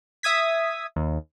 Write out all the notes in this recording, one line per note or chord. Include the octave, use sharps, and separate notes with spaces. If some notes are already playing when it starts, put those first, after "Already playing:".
E5 D#6 G#6 B6
D#2